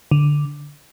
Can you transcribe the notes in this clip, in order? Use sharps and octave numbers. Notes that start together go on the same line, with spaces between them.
D3